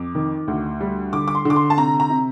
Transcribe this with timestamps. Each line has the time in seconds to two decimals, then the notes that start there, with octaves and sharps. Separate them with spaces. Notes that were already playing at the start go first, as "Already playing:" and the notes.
Already playing: F2 D6
0.15 D#3
0.48 D2
0.81 G3
1.13 D3 D6
1.28 D6
1.35 C6
1.45 D3 D6
1.56 C6
1.70 A5
1.77 C3 A#5
2.00 A#5
2.10 C3